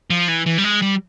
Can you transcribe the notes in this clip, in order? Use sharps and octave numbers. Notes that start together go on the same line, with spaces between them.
F3
E3
E3
G3
G#3
G3